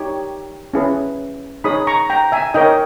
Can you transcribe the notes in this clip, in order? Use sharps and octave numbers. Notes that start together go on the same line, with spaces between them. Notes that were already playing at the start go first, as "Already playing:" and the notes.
Already playing: D#4 G4 C#5
C#4 E4 G#4 B4
D#4 G#4 C#5 B5 D#6
A#5 C#6
G5 A#5
E5 G#5
D#4 A#4 C#5 D#5 G5